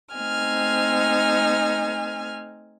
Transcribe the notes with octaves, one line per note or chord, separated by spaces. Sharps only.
A3 C4 D#4 G#5 F6